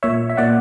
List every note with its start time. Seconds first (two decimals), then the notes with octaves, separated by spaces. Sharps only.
0.03 A#2 C#5 E5
0.29 E5
0.37 A#2 D5 F#5